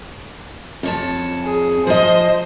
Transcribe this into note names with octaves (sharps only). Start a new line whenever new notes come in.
F2 C#5 A5
G#4
F3 C5 D#5